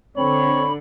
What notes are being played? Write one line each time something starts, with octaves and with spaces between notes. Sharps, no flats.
D3 C4 C#5 B5